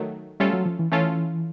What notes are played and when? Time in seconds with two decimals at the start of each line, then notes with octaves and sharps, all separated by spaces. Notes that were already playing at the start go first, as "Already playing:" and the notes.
Already playing: D#3 F#3 A3
0.40 G3 A3 C#4 F4 A4
0.53 F#3
0.66 F3
0.79 E3
0.92 E3 A3 C#4 F4 A4